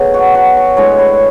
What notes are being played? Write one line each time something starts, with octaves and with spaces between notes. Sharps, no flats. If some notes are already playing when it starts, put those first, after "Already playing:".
Already playing: B2 F#3 A3 G#4
F#4
F#4
C#5
A2 G#3 D4 C#5
B4